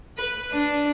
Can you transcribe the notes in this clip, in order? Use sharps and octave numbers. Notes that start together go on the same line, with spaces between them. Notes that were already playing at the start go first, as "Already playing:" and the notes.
B4
D4